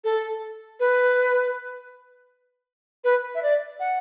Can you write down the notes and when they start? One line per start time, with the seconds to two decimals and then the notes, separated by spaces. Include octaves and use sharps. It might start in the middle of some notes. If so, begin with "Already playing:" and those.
0.04 A4
0.80 B4
3.04 B4
3.35 E5
3.43 D5
3.80 F#5